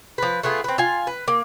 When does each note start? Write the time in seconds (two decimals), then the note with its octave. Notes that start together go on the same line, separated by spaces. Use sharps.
0.18 F3 B4
0.43 A3 B3 F4 G#4
0.64 C4 B4
0.78 F4 G#5
1.07 B4
1.28 A#3